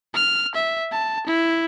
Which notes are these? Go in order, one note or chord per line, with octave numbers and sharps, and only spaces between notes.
F6
E5
A5
E4